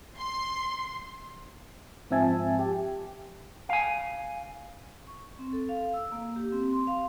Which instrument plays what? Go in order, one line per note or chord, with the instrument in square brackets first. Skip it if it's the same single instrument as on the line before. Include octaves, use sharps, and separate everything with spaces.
[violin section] C6
[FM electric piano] G#2 F3 C4 E5 G#5 A5
G4
[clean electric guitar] F5 G#5
[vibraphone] C#6
C4
A4
F5
E6
A#3
G4
C4
C6
F5